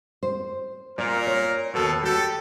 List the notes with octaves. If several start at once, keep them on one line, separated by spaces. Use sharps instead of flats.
C5
A#2 A#4 D5
C#5
D#2 B2 F#4 A4
F#4 G4 A4